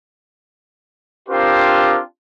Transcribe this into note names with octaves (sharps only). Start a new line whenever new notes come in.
C4 D4 F4 G4 A#4 C5